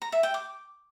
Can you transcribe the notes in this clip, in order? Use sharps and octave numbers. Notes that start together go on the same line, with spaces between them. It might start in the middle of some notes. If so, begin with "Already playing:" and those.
A#5
E5
G5
D6